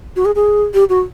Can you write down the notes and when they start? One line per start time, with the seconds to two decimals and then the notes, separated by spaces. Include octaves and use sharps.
0.16 F#4
0.25 G#4
0.35 G#4
0.74 G4
0.89 F#4